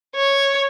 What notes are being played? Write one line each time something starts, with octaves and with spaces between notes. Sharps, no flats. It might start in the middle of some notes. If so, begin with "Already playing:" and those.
C#5